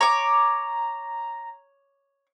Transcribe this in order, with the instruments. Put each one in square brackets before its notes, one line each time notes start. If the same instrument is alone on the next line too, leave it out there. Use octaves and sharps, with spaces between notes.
[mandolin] C#5 D6 [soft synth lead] A#5